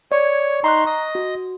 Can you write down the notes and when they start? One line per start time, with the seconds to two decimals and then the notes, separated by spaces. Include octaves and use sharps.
0.12 C#5 D5
0.64 D#4 A#5 C6 C#6 F#6
0.86 D#5
1.15 F#4